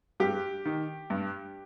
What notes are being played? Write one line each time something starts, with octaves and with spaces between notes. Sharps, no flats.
G2 G4
D#3
G2